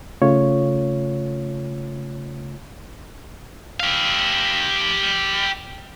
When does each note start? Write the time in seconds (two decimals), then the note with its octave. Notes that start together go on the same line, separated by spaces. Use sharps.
0.22 C#3 A3 F4 C#5
3.80 G4 F5